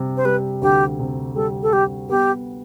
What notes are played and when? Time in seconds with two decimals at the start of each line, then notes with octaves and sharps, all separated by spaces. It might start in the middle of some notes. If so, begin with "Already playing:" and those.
Already playing: C3 G3
0.17 C5
0.25 G3 B4
0.62 D2 G4
1.00 C3
1.35 G3 A4
1.63 A4
1.72 G3 G4
2.09 B3 G4